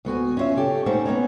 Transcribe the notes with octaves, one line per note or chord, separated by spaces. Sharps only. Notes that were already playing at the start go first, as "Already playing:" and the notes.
D2 B3 F#4 G#5
C#4 E4 F4 C#5 E5
C#3 G4 A4
A3 C#4 D#4 C5 F#5
B3 C#4 D#4 C#5